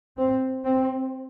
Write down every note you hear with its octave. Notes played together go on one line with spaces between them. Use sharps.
C4
C4